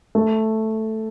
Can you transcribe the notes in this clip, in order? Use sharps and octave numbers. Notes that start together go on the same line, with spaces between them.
A3